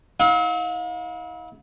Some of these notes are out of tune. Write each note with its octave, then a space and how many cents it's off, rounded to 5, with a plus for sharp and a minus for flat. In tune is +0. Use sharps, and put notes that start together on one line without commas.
E4 -40 F5 +40